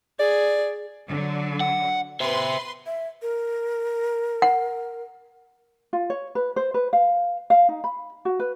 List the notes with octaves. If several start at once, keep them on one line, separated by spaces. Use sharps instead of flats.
G#4 D5
D3 F#3
F#5
B4 C5 E5 C6
E5
A#4
F#5
F4
C#5
B4
C5
B4
F5
F5
D#4
B5
F#4
B4